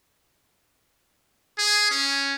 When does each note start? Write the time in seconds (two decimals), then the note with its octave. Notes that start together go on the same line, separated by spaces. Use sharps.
1.58 G#4
1.91 C#4